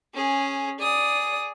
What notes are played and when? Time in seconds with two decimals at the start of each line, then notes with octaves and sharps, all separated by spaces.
0.14 C#4 G#4
0.79 G#4 D5 D#6